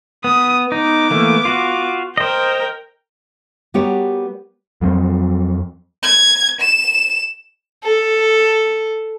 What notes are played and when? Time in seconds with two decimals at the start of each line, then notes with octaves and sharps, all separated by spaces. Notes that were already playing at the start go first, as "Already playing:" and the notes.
0.24 B3 D#6
0.72 B3 D#4 D6
1.11 E3 A3 A#3
1.45 F4 F#4
2.17 A#4 C5 D#5 G5
3.74 G3 B3 F#4 G4 A#4 C#5
4.81 F2 F#3 A3 C4
6.03 G#6
6.60 E7
7.84 A4